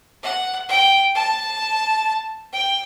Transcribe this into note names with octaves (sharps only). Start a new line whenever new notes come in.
F#5
G5
A5
G5